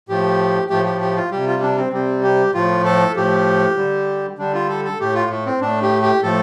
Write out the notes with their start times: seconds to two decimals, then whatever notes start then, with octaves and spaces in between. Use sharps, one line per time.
0.09 A2 F3 A3 G4
0.70 A2 F3 A3 G4
0.86 G4
1.01 G4
1.16 F4
1.31 C3 G3 G4
1.46 F4
1.62 D4
1.77 C4
1.93 C3 G3 C4
2.23 G4
2.54 A2 F3 A3 F4
2.85 A4
3.16 A2 F3 A3 G4
3.77 D3 G3
4.38 D3 G3 D4
4.54 F4
4.69 A4
4.85 A4
5.00 A2 A3 G4
5.15 F4
5.30 A3
5.46 C4
5.61 A2 A3 D4
5.82 G4
6.02 G4
6.23 A2 F3 A3 A4